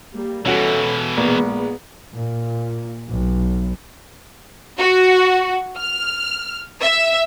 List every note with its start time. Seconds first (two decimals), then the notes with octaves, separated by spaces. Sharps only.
0.15 G3 A#3
0.45 B2 E3 C#4 F#4 A4
1.17 A#1 G#3 B3
2.14 A#2
3.09 B1
4.77 F#4
5.77 F6
6.81 E5